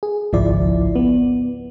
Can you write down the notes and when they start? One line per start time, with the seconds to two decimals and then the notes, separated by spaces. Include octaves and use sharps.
0.03 G#4
0.33 G#1 C#2 F3 E4 D5
0.96 B3